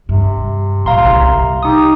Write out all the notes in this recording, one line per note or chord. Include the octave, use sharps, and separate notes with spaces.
G2 C3
A#2 F5 A#5 C6
C2
D#4 G4 D#6